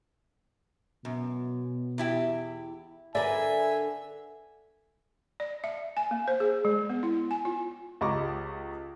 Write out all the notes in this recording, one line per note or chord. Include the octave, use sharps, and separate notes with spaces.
F#2 B2
E2 E4 G4
D3 A#4 B4 D5 E5 G#5
D5
E5
G#5
A#3
C5
G#4
G#3
B3
E4
G#5
F4
C#2 G4 D#5 A#5 C#6 D6